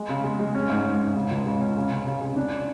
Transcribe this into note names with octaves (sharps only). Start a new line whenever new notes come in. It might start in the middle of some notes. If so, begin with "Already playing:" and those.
Already playing: G#3
C#3
G#3
G#3
C#4
G#2
G#2
G#2
C#3
C#2
C#3
C#4
C#3
C#3
C#3
C#3
D4